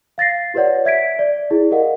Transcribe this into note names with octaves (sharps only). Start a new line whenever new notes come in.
F5 A6 A#6 C7
F4 G4 B4 C#5 D5 F#5
E5 G#6 B6 D7
D5
E4 G#4 D5
G4 A#4 D#5 F5 F#5